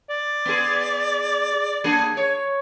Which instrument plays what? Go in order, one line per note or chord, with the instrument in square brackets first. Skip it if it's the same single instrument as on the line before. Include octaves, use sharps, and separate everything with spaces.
[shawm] D5
[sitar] B3 G#4
A#3 D4 G#4
C#5